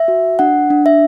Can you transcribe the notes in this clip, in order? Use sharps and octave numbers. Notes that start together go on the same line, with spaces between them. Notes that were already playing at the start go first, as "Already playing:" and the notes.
Already playing: E5
F#4
D4 F#5
D4
E5